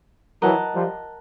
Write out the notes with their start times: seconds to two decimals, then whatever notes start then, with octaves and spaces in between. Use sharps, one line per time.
0.42 E3 F#3 A#4 D#5 F#5 A5
0.75 F3 G3